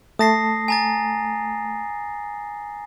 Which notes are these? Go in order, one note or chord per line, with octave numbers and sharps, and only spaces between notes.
A3 A5 D#6 A#6 C7
G#5 A#5 A6